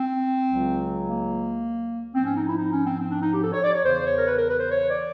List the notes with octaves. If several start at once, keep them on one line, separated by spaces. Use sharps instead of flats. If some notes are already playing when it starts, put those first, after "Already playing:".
Already playing: C4
C#2 C#3 F#3
A#3
G#2 F3 C4
C#4
D#4
E4
D#4
C#4
C4
C4
D4
D#4
G4
A4
C#5
D5
C#5
E2 C#3 E3 C5
C#5
A#4
B4
A#4
B4
C5
C#5
D5